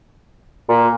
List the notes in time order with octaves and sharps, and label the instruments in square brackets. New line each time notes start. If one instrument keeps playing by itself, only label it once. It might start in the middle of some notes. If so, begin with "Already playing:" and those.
[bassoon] A#2